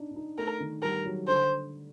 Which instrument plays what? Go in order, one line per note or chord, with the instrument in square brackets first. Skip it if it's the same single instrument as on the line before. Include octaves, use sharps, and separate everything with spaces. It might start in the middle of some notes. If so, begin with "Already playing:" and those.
Already playing: [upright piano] D4 D#4
D4
D#4
[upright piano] A3 [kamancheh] A#4
[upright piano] D#3
[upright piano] G3 [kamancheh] A#4
[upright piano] F#3
[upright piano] D3 [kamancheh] C5